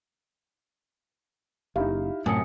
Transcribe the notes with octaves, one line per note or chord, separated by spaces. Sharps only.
F#1 D#4 E4 G4 F5
F#2 A2 C3 G#5 D#6 C#7